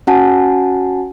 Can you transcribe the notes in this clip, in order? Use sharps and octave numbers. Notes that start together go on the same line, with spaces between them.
C#4 F#4 F#5 G#5 A5